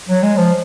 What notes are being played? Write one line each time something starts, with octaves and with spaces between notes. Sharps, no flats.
F#3
G#3
F3